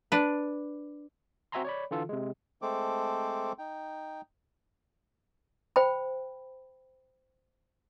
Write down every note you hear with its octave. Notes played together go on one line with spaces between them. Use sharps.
D4 B4
C4 F#4 E5 G#5 A#5 C6
C#5 D5 B5
D3 E3 F4 A4
C3 G#3
G#3 A3 C4 A4 C5 D6
D#4 G5
C5 G5 B5